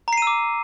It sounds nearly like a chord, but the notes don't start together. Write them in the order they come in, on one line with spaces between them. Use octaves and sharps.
A#5 C7 D#7 E6 D6